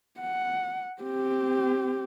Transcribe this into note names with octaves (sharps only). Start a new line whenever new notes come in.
F#5
C4 G4